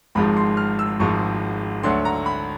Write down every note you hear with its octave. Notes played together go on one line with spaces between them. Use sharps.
G#1 G#2 F3 G#3 B5
C6
F6
E6
G#1 G#2 F3 G#3 C#6
D2 D3 F#3 C6
A#5
B5